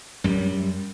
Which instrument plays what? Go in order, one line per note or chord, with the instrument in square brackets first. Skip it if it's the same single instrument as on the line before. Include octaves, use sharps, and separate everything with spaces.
[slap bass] F#2 G3